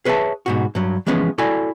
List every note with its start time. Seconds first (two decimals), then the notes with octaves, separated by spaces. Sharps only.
0.05 G#4 B4 C#5 D#5 E5 A5
0.46 G#2 B2 F#4
0.75 G2 F#3
1.07 E3 F3 G#3 B3 C#4 G#4
1.38 E4 F#4 A4 D5 G#5